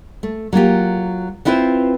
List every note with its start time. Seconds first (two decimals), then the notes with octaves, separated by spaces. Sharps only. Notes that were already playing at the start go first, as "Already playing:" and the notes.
0.23 A3
0.53 F#3 A#3 F4 G4
1.45 B3 C4 E4 F4 B4 C5